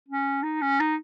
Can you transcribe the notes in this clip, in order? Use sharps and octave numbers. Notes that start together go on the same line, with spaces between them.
C#4
D#4
C#4
D#4